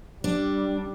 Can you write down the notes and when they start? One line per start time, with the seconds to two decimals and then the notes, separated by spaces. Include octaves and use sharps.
0.24 G3 D4